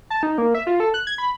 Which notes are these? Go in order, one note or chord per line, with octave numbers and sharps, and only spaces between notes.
A5
D#4
A#3
E5
F4
A4
F#6
G#6
B5